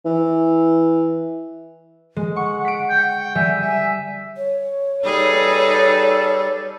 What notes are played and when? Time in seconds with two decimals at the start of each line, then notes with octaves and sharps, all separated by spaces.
0.05 E3
2.16 G#3
2.36 F#5 C#6
2.65 B6 D7
2.90 G5
3.35 G3 E5 G#5
3.61 E5
4.37 C#5
5.05 G3 D#4 G#4 A4 B4